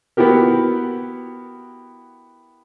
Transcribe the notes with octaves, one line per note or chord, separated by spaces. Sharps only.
B3 E4 F#4 G4 A#4